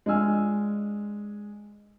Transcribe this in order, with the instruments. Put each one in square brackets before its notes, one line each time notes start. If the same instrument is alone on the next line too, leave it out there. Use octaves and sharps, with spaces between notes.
[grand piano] G#3 D4 F4 G#5 E6 F6